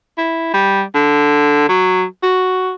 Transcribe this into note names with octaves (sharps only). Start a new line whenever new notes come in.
E4
G3
D3
F#3
F#4